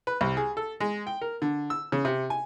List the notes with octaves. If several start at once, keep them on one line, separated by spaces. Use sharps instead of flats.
B4
C2
G#4
A4
G#3
G5
A#4
D3
E6
C#3
C3
G#5